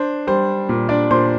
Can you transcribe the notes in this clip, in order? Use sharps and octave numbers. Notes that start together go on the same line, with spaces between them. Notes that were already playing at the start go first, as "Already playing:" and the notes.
Already playing: D4 C5
G3 C5
A#2
D4 D5
A#2 C5 C6